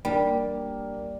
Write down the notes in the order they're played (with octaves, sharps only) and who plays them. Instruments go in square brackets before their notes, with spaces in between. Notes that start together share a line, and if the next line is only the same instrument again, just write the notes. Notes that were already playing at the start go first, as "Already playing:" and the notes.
[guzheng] G3 [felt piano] A#3 D4 A#4